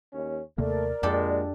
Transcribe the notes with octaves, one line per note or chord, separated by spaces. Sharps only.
D#2 C#4
D#2 C3 A3 A#3 A#4 D5
F2 A#2 D3 G#3 D4 G4 A4